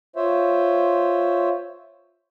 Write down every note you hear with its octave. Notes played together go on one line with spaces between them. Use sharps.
F4 C5 C#5 E5